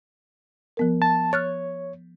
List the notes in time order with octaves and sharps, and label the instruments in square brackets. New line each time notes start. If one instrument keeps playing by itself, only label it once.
[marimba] F3 B3 A#4
[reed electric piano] A5
[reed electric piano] C#5 [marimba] F6 F#6 A6